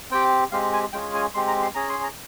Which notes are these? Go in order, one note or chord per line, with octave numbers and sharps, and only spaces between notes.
C4 G4 G5
G#3 C4 G4 F5
G#5
G#3 C#4 F4 G#4 G5
G#5
G#3 C4 G4 C6
A#5
C6
C#4 G#4 A#5
C6
A#5